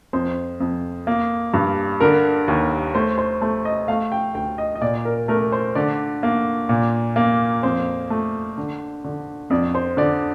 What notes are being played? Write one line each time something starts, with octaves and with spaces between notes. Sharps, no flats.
F2 C5
F2
A#3
G2
D3 A#4
D#2
A3 C5
C5
A3 C5
D#5
A3 F5
G5
D2 G5
D#5
D#5
A#2 D5
A#4
A3 A#4
C5
D3 D5
A#3
A#2
A#3
F2 C5
A3
D3
D3
F2 D5
C5
D3 D5